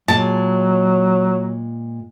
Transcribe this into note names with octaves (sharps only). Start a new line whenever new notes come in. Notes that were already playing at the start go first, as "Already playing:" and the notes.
A#2 F#3 G#3 A5